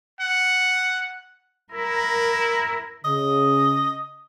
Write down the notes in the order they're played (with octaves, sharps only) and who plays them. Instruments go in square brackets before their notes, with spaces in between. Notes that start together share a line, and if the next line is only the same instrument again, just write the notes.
[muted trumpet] F#5
[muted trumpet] E4 [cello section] A#4
[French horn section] C#3 [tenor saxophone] D#5